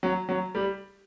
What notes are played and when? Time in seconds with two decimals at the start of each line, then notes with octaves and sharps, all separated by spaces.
0.03 F#3
0.29 F#3
0.55 G3